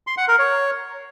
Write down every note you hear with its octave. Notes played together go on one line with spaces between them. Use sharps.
C6
F#5
A#4
C#5